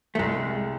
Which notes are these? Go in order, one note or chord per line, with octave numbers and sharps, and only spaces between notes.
A3
C2 G#3